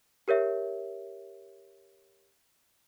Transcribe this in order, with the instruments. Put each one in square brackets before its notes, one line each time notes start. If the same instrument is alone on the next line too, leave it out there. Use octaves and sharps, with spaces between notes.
[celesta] G4 A#4 C#5 E5